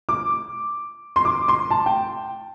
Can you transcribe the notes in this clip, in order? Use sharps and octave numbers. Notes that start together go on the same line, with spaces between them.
D6
C6
D6
C6
A5
G5